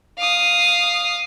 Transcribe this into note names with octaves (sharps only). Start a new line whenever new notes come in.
F5 D#6